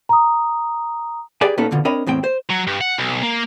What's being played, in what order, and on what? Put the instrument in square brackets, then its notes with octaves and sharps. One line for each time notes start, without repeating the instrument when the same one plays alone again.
[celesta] A#5 D#6
[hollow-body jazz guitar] G4 G#4 B4 D5 G5 G#5
A#2 B3 C#4 D#4 A4
F2 B2 D3 F3
C4 D4 A#4 C#5 D#5 B5
E2 A2 C4 G5
C5
[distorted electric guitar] F#3
G2
F#5
B1
A#3